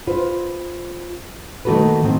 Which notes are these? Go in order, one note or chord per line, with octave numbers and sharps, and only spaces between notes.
F4 B4 C5
D#3 A3 A#3 F#4 A4 B4
A2 D#3 C4